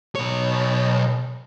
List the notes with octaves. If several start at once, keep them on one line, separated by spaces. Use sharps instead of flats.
B1 C#5